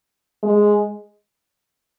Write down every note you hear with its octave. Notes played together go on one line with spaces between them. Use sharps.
G#3